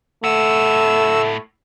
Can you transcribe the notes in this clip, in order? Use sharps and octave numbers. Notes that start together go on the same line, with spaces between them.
A2 A3 F#5 E6